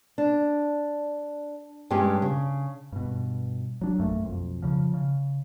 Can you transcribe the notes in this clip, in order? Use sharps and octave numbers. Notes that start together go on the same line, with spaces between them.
D4
G2 G#3 C#4 G4
C#3
G2 B2
F#3 D4
A#1 F#2 A3 A#3
B1 F2
C#3 F3
C#3